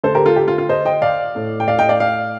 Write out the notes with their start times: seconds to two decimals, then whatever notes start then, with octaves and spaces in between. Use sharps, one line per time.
0.04 D3 A3 A4 C5
0.15 G4 A#4
0.26 F4 A4
0.36 G4
0.48 F4
0.58 F4
0.69 C5 D#5
0.85 D#5 G5
1.02 D5 F5
1.35 A2 A3
1.60 G5
1.68 D5 F5
1.78 D#5 G5
1.89 D5 F5
2.00 D5 F5